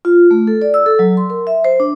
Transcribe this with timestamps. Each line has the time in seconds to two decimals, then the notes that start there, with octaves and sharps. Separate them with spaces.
0.05 F4
0.31 A3
0.47 A4
0.62 D5
0.74 E6
0.86 A4
0.99 F#3
1.17 C6
1.30 A#4
1.47 E5
1.65 C5
1.80 D4